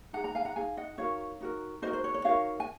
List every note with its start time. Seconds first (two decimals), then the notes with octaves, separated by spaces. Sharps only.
0.13 D#4 G#4 F#5 A#5
0.24 F#5 A#5
0.35 F5 G#5
0.45 F#5 A#5
0.56 D#4 G#4 F5 G#5
0.77 D#5 F#5
0.98 D#4 F#4 A#4 C#5 F5
1.41 D#4 F#4 A#4
1.82 D#4 F#4 A#4 C5 D#5
1.93 C5
2.04 C#5
2.14 C#5
2.25 D#4 F#4 A#4 C#5 F5
2.60 G#5